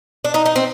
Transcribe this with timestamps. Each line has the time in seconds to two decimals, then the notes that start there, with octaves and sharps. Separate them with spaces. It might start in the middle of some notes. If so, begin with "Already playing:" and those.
0.25 D4
0.34 D#4
0.46 D#4
0.56 C4